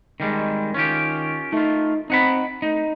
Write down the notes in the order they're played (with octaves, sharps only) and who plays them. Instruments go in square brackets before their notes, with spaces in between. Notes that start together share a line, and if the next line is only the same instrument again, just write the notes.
[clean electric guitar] D#3 G3 G#3
[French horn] D#3 [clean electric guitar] C#4 F4 G4
[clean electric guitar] A3 F4 [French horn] D#4
[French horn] C4 [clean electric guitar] D#4 F#5 B5
[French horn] A3 [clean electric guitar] D#4